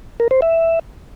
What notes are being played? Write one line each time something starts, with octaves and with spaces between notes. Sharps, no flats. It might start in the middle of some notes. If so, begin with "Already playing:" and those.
A#4
C5
E5